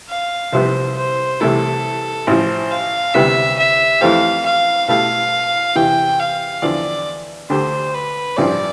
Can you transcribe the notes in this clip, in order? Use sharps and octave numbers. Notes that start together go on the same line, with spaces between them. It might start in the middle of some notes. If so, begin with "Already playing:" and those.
F5
C2 C3 F3 B3 C5
C5
C2 C3 E3 A3 E4 A4
A1 A2 F3 C5
F5
D2 C3 G3 B3 E5
E5
F2 E3 A3 C4 G4 F5
F5
B2 A3 E4 G4 F5
E2 C3 E3 G5
F5
E2 D3 F3 D5
D2 D3 A3 D4 G4 C5
B4
A1 G2 F3 C4 D5